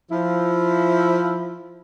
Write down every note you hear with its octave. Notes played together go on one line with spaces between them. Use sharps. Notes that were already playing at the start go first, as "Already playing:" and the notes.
F3 E4